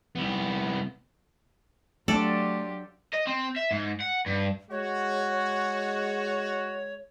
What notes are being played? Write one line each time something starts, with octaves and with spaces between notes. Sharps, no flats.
C2 B3
F#3 A3 D4 F4 G4 A4 D5
D#5
C4
E5
G#2
F#5
G2
G#3 F#4 C#5